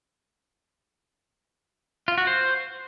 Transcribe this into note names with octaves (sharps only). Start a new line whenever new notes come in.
F4
F#4
C5